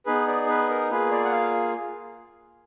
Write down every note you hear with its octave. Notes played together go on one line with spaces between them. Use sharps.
B3 D#4 G#4 B4
D5
B4
A#4
A#3 F4 G#4 B4
D5
F#5
F5